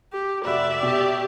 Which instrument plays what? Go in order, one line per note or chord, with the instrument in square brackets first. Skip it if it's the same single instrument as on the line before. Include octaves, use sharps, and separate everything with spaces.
[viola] G4
[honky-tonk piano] F1 F#4 B5 [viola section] D5 [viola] E5
[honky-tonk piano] B2 [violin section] G4